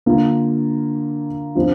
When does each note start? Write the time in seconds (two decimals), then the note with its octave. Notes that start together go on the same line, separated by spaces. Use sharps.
0.06 D3 A#3 F4
1.55 C3 F3 D4 F4